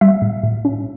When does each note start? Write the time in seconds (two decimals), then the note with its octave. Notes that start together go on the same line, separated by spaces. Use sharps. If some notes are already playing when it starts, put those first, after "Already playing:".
0.01 G3 E5
0.22 A2
0.43 A2
0.65 C#4